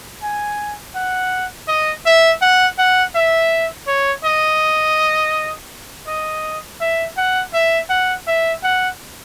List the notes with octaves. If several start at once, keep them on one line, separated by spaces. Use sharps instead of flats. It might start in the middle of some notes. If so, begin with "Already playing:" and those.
G#5
F#5
D#5
E5
F#5
F#5
E5
C#5
D#5
D#5
E5
F#5
E5
F#5
E5
F#5